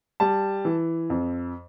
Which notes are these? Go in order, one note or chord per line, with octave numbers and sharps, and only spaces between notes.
G3 A5
E3
F2